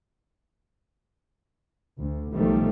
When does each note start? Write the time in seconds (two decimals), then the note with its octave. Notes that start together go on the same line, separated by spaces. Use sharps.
1.99 D2
2.34 B1 D#3 F3 G3 A3